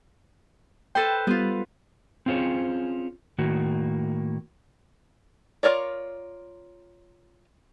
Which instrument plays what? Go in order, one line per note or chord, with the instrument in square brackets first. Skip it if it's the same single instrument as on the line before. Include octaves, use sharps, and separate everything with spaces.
[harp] A4 B4 C5 [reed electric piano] G5
[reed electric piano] G3 [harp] B3 F4
[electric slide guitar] C4 C#4 F4 G#4 C5 C#5
A2 D#3 A#3 F#4
[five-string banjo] F4 F#4 A#4 C#5 D5